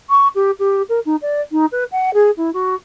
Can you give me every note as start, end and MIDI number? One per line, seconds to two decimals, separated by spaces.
0.10 0.28 85
0.35 0.51 67
0.59 0.82 67
0.89 1.00 70
1.06 1.16 63
1.22 1.41 74
1.52 1.66 63
1.72 1.84 71
1.92 2.10 78
2.14 2.31 68
2.37 2.50 64
2.54 2.75 66